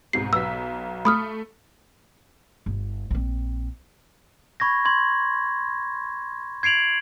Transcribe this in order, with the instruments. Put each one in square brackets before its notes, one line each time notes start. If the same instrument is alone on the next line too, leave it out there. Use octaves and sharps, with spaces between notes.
[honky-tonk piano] C2 G#2 B2 [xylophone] C7
[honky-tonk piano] B1 B3 B6 [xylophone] E6
[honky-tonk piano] A3 [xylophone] B5 D#6 F6
[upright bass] G1
A#1 C4
[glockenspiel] B5 C#6 G#6 A#6
C6 G#6
G#6 C7 D7 F7 F#7